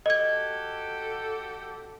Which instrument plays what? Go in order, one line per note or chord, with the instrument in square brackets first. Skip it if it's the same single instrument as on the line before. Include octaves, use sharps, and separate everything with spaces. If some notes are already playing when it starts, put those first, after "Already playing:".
[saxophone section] F#4 G4 A4 [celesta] D#5 G#6